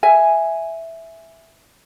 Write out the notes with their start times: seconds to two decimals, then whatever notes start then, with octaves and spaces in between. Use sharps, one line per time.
0.03 E5 G#5